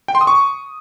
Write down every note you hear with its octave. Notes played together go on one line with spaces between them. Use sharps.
G5
C6
D#6
C#6